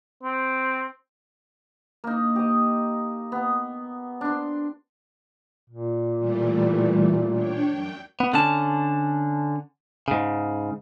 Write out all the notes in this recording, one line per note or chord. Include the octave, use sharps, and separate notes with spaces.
C4
A#3 D#4
G4 D#5
B3
D4 C6
A#2
E3 G3 A3
D4 C#5 G5
F#2 G5
B3
D3 C#4 A5
G#2 C#3